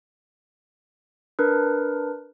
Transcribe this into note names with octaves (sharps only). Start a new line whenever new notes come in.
D4 A#4 B4